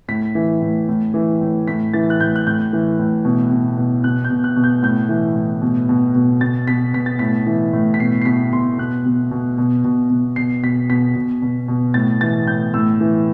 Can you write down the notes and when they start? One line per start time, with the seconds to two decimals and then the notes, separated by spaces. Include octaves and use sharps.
0.08 A2 B6
0.35 E3
0.62 A2
0.89 A2
1.14 E3
1.41 A2
1.68 A2 B6
1.94 E3 A6
2.10 F#6
2.20 A2 G6
2.36 F#6
2.47 A2 G6
2.73 E3
2.99 A2
3.25 B2
3.51 B2
3.77 B2
4.04 B2 F#6
4.24 G6
4.30 B2
4.44 F#6
4.56 B2
4.64 G6
4.83 A2 G6
5.09 E3
5.36 A2
5.62 B2
5.89 B2
6.15 B2
6.41 B2 A6
6.67 B2 B6
6.94 B2 B6
7.06 A6
7.19 A2 B6
7.46 E3
7.73 A2
7.94 B6
8.00 B2 C7
8.22 C7
8.25 B2 B6
8.52 B2 C6
8.78 B2 F#6
9.06 B2
9.31 B2
9.58 B2
9.84 B2
10.10 B2
10.36 B2 C7
10.63 B2 B6
10.90 B2 B6
11.15 B2
11.42 B2
11.68 B2
11.94 A2 A6
12.21 E3 A6
12.47 A2 G6
12.74 A2 E6
13.01 E3